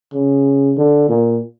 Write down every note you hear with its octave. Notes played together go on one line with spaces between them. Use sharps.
C#3
D3
A#2